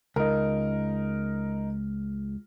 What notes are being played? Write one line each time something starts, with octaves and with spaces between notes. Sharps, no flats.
C#2 D#4 A#4